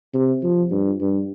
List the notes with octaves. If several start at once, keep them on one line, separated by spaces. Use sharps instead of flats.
C3
F3
G2
G2